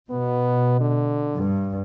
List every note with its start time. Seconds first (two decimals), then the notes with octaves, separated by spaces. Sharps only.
0.10 B2 B3
0.81 D3
1.35 G2